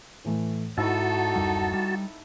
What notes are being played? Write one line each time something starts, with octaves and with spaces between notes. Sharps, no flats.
A2 E3 A3
G#2 D#4 E4 F#4 A4 E5 A5 E6
D1 F#2 G3
G3